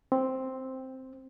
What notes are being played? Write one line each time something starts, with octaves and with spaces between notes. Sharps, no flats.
C4